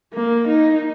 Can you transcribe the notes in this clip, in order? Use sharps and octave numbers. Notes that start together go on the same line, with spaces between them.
A#3
D#4